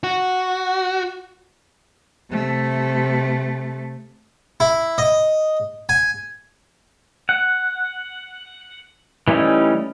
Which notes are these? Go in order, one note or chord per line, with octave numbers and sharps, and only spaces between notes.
F#4
C3 A3
E4
D#5
G#5
F#5
E3 G3 A3 C#4 D#4